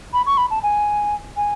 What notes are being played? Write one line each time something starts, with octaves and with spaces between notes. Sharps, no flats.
B5
C#6
B5
A5
G#5
G#5